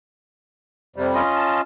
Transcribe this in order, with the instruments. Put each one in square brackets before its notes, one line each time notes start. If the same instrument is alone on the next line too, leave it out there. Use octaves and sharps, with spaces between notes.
[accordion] F2 C3 G3
[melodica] C#4 F4 D#5
[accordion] A5